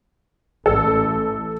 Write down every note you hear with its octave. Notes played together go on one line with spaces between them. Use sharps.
A1 A4